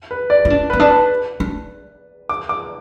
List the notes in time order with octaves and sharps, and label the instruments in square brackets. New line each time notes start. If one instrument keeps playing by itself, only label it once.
[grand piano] B4
D5
[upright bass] E4
D4
[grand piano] B4
[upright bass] B3
D4
[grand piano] B4
[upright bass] D4
[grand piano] D6
D6